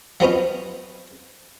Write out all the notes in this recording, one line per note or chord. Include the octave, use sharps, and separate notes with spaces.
F3 F#3 B3 C#4 D#4